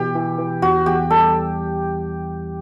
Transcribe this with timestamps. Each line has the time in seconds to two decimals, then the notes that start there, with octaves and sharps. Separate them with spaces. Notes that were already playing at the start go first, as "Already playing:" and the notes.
Already playing: B2 E3 G4
0.15 E3
0.38 E3
0.62 E2 F#4
0.86 E2 G4
1.10 G3 A4